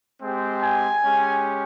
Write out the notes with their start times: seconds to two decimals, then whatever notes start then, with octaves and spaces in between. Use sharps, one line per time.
0.21 G#3 C4 G4
0.62 G#5
1.04 G#3 C#4 G4